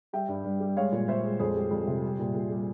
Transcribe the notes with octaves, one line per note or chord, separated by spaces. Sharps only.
G3 E5 G5
G2
G2
G3
G#3 C#5 F5
A#2
A#2 C5 E5
G#3
F2 G#4 C5
G3
F2
C3
G3
A#2
A#2
G3